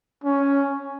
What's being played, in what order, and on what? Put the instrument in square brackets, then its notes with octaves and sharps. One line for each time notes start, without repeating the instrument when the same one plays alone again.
[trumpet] C#4